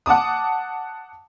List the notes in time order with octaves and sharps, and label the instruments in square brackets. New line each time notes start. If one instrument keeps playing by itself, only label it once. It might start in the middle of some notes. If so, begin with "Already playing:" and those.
[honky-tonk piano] F#5 A5 D6 D#6